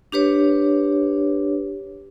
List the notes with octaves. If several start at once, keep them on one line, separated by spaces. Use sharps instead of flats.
D4 G4 B4 C#5